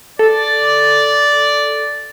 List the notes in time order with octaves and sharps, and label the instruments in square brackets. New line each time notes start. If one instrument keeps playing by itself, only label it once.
[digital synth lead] A4 [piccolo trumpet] D5